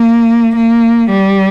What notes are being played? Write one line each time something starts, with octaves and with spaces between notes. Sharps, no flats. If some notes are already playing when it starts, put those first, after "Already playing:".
Already playing: A#3
A#3
G3